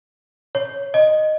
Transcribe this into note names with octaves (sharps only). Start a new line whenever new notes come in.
C#5
D#5